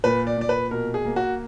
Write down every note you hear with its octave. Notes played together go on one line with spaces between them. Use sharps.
A#2 B4
D5
A#2 D5
B4
B2 A#4
G#4
A#3
F#4